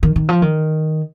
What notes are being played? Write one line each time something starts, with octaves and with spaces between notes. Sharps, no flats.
D#3
D#3
F3
D#3